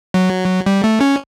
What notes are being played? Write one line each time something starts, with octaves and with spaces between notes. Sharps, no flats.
F#3
G3
A3
C#4